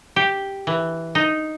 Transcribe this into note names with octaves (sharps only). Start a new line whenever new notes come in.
G4
E3
D#4